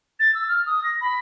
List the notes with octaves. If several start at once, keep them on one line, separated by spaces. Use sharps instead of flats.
A6
E6
F6
D#6
A#6
B5